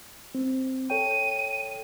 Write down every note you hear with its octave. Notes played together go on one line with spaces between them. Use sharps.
C4
A4 C#5 G5 D#7